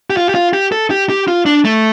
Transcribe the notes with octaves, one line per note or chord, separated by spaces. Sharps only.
G4
F4
G4
F4
G4
A4
G4
G4
F4
D4
A3